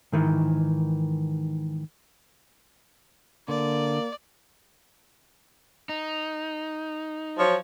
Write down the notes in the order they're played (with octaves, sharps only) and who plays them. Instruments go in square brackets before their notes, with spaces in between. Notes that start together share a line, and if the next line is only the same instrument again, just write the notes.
[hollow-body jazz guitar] G#2 D#3 E3
[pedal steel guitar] D3 [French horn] A#3 [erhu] D5
[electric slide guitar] D#4
[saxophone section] F3 F#3 C#5